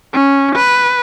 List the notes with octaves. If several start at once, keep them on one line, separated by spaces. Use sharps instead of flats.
C#4
B4